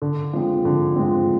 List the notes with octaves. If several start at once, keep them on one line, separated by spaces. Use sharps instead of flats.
D3
F3 G#3 C4
D3
F3 G#3 C4